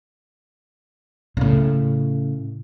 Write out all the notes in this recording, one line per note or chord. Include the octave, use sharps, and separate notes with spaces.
A2 C#3